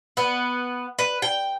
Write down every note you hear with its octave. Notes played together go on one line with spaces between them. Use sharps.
B3
B4
G5